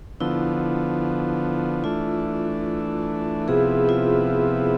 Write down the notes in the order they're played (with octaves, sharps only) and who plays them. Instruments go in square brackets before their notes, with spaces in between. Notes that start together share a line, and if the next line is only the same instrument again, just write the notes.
[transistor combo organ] D3 F3 B3 [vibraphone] E4
[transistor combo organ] E3 A3 D4 [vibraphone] F4
[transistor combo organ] C3 F3 B3 E4 [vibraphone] G#4
[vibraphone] F4